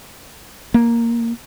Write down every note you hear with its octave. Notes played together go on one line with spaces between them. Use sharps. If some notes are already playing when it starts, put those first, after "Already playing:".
A#3